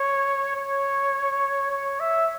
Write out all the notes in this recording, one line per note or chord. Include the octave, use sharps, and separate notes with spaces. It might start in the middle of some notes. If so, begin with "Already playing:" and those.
Already playing: C#5
C#5
C#5
E5